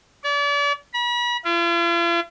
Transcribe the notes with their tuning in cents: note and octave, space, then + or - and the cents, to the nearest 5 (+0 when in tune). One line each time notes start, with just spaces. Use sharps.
D5 -40
B5 -40
F4 -45